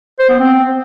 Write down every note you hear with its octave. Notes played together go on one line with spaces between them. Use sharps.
C5
B3
C4